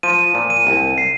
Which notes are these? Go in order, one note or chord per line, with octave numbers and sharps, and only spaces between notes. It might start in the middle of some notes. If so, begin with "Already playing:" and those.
F3 D#7
A#2
D#7
C2
C7